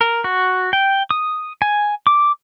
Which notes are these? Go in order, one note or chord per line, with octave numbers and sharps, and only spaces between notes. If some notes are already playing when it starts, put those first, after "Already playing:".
A#4
F#4
G5
D#6
G#5
D6